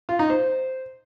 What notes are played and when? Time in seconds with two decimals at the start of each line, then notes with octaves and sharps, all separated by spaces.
0.09 F4
0.19 D#4
0.30 C5